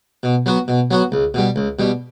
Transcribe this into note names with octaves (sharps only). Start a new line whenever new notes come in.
B2
F#3 B3 F#4
B2
F#3 B3 F#4
C#2
B2 G3
C#2
B2 G3